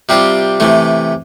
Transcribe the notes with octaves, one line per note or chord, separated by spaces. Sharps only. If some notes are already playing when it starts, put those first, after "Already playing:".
C3 G3 C4 F4
C3 E3 A3